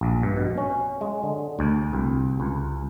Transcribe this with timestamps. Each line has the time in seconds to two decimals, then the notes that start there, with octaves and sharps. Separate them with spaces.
0.01 A#1
0.23 G2
0.37 B2
0.58 C#4
1.01 G#3
1.23 D3
1.59 D2
1.93 C2
2.40 C#2